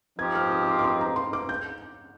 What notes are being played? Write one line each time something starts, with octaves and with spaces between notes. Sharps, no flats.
F3 C4 D#4 G4 C5 G#6
F6
D#6
D6
D6
C6
A#5
C6
D6
G6